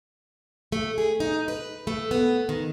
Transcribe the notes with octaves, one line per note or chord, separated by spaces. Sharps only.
A3
G#4
D#4
B4
A3
B3
D#3